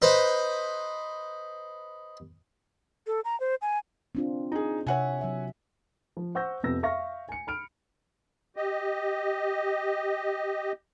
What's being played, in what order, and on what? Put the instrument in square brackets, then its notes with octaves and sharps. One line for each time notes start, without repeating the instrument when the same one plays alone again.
[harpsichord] D#4 B4 C5
[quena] A4
A#5
C5
G#5
[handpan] C4 D4 F4
[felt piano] D#4 G#4
[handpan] C3 E5 [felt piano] C#5 F#5 G#5
[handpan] F#3 E5
[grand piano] F3
C5 F#5 C#6 E6 G6 A#6
F2 C3 B3 E6 A#6
E5 F5 C#6 F6 A#6
G#5 C#7
B5 F6 D7
[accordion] G4 D#5